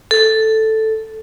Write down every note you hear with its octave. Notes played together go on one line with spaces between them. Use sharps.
A4